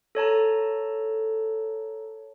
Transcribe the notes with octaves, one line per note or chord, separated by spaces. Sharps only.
A4 C#5 A5 A#5